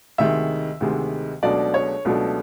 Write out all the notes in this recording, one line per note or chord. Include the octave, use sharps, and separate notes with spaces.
D2 C3 D#3 G#3 E5
D2 C3 D#3 G#3
C#2 B2 F#3 A3 D4 D5
C#5
C#2 B2 F#3 A3 D4